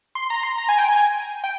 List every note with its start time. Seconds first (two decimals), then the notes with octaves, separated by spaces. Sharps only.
0.15 C6
0.30 A#5
0.43 C6
0.58 A#5
0.69 G#5
0.78 G5
0.88 G#5
1.44 G5